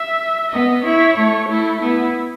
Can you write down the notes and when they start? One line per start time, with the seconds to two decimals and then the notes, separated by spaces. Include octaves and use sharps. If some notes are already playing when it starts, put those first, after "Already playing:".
Already playing: E5
0.52 B3 D#5
0.85 E4 C#5
1.17 A3
1.48 A3 E4
1.81 B3 E4